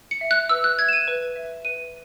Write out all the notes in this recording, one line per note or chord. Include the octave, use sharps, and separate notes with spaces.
C#7
E5
F#6
B4 E6
F#6
E5 G#6
E7
D#7
B4
E5
B4 D#7